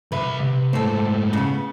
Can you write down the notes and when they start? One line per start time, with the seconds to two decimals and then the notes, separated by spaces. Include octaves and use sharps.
0.12 C2 B4 E5
0.41 C3
0.73 G#2 A3 A4 C5
1.33 C#3 B3